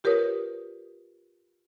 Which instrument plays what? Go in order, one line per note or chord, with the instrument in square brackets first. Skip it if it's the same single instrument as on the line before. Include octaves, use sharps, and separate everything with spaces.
[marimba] F4 G4 A#4 B4 C#5 D#6